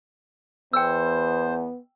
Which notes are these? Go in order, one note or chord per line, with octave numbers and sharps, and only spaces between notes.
E2 B3 C5 G5 E6